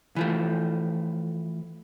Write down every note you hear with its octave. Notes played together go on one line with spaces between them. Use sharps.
E3 F3 A3